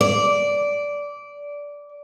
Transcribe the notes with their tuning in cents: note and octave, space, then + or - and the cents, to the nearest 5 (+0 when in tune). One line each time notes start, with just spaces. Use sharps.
D5 -15